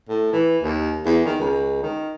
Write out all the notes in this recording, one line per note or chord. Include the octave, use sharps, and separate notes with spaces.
A2
E3
D#2
E2
D#3
C#2
D#3